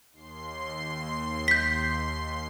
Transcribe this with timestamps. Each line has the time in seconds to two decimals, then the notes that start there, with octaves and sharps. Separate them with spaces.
0.12 D#2 C6 C7
1.48 G6 B6